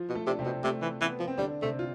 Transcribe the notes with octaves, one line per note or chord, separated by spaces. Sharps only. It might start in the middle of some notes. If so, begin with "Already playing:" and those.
Already playing: F3 F4
B2
A3 A4
C3
D4
C3 C4
B2
C3 A3
E3
E3 B3
F3
C4
D3 G3 D4
C3 A3 C4
F4